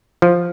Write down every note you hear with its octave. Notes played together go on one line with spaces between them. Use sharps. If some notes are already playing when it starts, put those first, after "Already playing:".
F3